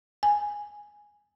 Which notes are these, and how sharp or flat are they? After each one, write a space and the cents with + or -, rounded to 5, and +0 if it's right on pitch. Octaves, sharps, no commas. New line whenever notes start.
G#5 -5